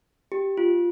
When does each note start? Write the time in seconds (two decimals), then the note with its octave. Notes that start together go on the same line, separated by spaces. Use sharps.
0.32 G4
0.57 F4